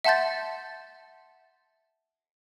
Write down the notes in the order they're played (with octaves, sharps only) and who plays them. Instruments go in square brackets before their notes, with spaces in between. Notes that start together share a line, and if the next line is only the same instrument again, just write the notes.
[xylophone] E5 F#5 A5 C6 G6 A6